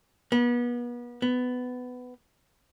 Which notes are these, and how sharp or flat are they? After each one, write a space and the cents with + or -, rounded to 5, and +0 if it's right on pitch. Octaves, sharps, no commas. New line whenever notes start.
B3 -35
B3 +15